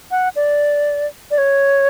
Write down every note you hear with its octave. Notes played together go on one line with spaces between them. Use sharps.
F#5
D5
D5
C#5